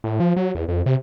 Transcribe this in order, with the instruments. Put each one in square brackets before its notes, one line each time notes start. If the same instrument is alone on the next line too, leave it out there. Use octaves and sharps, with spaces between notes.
[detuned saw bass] A2
F3
F#3
E2
F2
C3